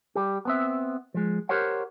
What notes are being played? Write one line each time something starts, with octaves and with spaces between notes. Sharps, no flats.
G3 G4
B3 C4 E5
F3 G#3
G4 A#4 C5 C#5 F#5